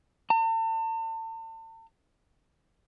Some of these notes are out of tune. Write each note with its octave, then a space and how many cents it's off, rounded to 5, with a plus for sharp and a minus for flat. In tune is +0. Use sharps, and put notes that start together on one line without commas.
A5 +40